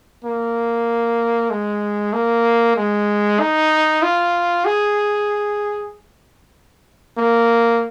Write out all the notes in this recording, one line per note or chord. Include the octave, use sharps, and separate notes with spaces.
A#3
G#3
A#3
G#3
D#4
F4
G#4
A#3